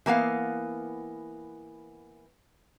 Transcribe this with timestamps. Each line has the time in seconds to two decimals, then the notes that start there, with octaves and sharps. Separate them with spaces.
0.06 E3 A#3 B3 F5